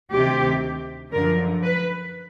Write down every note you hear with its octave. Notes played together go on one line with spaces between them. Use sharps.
D2 C3 D#3 G4
F#2 D3 F3 A#4
B4